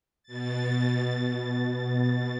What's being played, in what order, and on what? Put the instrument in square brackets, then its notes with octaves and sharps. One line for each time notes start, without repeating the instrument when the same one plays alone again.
[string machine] B2 A6